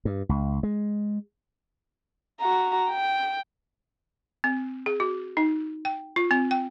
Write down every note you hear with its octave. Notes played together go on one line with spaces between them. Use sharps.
G2
C#2
G#3
F#4 A#5
G5
C4
G#4
F#4
D#4
G5
F4
C4
G5